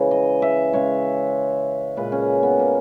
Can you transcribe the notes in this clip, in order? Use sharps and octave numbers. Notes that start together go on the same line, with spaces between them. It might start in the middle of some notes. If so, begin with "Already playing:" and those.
Already playing: C#3 E3 G#3
D#5
E5
C#3 G#3 C#5
A#2 G#3 B4
C#4
B3
A#3